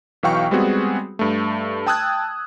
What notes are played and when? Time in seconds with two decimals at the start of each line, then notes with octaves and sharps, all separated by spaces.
0.23 B1 E3 F#3 F5 G5 C#6
0.51 G3 G#3 B3 C4 F#4 G#4
1.19 G2 A3
1.87 G5 A5 D#6 E6 F#6 G#6